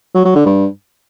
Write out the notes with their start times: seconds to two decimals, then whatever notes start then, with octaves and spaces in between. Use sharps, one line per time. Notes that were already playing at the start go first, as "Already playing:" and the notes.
0.15 F#3
0.25 F#3
0.35 D3
0.46 G2